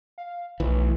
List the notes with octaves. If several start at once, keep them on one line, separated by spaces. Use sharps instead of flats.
F5
B1 E3 A3